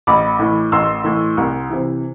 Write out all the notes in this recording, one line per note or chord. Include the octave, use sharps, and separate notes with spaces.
A1 B5 D6
A2 E3
A1 C6 E6
A2 E3
C2
C3 E3